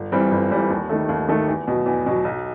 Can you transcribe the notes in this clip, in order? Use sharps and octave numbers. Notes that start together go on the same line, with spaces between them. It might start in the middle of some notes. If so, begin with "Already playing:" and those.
Already playing: G1
G2 E3 G3 C4
G1
G2 E3 G3 C4
D#2
D#3 A3
D#2
D#3 A3
E2
B2 F#3
E2
B2 F#3
B1